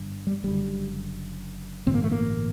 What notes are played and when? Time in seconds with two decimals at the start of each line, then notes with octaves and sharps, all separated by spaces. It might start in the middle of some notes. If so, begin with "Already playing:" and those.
Already playing: G1 G2 D3
0.27 G3
0.44 F#1 F#2 D3 G3
1.86 A1 G2 D3 C4
1.94 A#3
2.03 A3
2.12 A#3